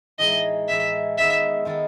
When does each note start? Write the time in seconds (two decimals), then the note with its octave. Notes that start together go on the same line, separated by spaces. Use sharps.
0.19 A2 E3 G#3 D#4 D#5
0.68 A2 E3 G#3 D#4 E5
1.17 D#3 G#3 B3 D#4 A4 E5
1.65 D#3 G#3 B3 D#4 A4